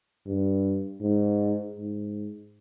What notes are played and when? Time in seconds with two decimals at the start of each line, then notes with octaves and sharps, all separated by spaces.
0.26 G2
1.02 G#2
1.76 G#2